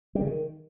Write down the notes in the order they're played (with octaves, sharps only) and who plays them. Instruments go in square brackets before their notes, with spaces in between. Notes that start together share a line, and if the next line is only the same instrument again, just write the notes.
[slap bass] G3
C#3
D#3